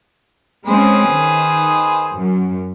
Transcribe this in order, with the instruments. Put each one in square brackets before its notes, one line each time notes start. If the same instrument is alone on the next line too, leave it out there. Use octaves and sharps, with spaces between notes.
[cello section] G#3 C4 C#4 [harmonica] G#4 B4 C5
[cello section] D#3
F#2